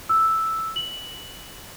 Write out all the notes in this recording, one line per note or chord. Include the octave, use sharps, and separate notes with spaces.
E6
F#7